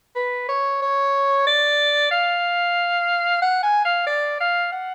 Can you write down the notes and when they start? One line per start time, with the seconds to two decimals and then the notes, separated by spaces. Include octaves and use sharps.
0.15 B4
0.49 C#5
0.82 C#5
1.47 D5
2.11 F5
3.42 F#5
3.63 G#5
3.85 F5
4.07 D5
4.40 F5
4.72 F#5